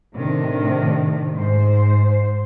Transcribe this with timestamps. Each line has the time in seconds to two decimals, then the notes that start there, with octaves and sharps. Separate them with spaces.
0.15 A2 C3 D#3 D4
1.34 G#2 C5